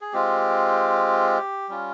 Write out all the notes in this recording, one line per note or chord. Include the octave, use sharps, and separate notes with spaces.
G#4
G#3 C4 F4 G4
G3 C#4 F4